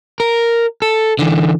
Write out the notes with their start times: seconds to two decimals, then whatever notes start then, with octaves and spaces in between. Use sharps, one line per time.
0.20 A#4
0.82 A4
1.19 D3 E3